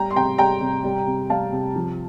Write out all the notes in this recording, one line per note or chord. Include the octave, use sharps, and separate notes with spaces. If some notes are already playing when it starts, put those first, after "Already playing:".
Already playing: G3 G5 A#5
C6
C3 G5 A#5
G3 G5 A#5
C3
G3
C3
G3 F5 A5
C3
F3